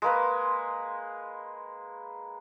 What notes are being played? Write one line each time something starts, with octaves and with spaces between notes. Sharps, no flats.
G#3 A#3 B4